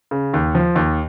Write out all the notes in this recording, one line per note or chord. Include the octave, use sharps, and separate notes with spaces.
C#3
D#2
F3
D#2